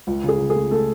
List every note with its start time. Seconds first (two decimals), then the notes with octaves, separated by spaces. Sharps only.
0.07 C#2
0.24 C#3 G#4
0.40 C#3
0.50 G#4
0.56 A3
0.71 A3 A4